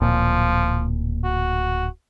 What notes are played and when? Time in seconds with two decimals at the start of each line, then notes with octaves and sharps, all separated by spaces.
0.01 D1 A#2 F3
1.24 F#4